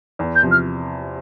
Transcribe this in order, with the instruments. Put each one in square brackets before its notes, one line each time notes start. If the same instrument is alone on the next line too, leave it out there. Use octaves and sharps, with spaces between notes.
[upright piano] E2
[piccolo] G6
[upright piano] C3 F3
[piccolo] F6